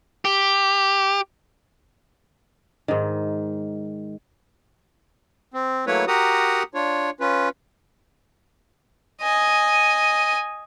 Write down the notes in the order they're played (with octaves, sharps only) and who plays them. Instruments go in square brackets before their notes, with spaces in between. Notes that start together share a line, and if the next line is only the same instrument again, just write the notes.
[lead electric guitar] G4
[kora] G#2 D#3
[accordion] C4
F#3 A3 A#3 E4 B4 C#5
F#4 G4 A#4 F#5 A#5 D#6
D4 F4 C#5
C#4 F4 B4
[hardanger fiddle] D#5 G#5